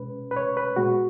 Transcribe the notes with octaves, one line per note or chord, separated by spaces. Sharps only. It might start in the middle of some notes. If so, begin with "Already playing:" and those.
Already playing: B2 G#3 C#4 B4
B4
C#5
B4
A#2 G#3 B3 F#4